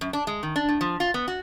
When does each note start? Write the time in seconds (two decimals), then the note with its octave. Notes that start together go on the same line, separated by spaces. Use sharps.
0.01 F#2
0.13 D4
0.27 G#3
0.43 D#3
0.56 D4
0.69 A2
0.81 F3
1.00 F4
1.14 B3
1.28 F#4